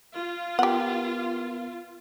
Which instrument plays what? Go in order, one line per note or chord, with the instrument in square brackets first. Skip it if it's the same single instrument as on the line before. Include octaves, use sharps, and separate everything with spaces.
[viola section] F4
[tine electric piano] B3 A#4 [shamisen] G4 F#5